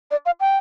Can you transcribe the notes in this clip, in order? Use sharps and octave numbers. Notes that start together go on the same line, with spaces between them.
D5
F5
G5